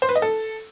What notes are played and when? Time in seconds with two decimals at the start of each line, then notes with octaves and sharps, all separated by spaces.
0.02 C5
0.09 B4
0.15 D#5
0.22 A4